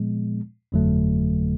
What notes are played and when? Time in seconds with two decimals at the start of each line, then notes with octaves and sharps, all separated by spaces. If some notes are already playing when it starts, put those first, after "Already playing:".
Already playing: A#2 F3 G#3 B3
0.72 G1 F2 D3 F#3 A3